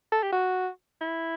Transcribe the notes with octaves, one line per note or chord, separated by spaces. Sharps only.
A4
G4
F#4
E4